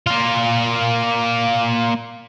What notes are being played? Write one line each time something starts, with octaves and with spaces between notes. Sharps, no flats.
A#3 F4